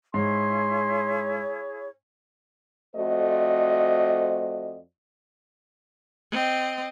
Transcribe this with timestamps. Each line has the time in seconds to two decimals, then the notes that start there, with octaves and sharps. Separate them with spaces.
0.14 G#2 E4 G#4 C#5 C6
2.95 F2 A3 F#4 C5 D5 D#5
6.31 C4 D#5